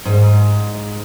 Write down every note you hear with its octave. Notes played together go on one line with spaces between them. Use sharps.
G#2